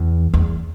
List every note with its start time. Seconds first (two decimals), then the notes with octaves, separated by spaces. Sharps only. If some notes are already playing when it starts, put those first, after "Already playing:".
Already playing: E2
0.34 E2